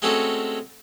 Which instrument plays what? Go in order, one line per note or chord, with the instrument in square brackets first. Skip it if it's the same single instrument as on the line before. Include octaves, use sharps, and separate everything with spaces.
[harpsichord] G#3 A3 C4 C#4 F#4 A4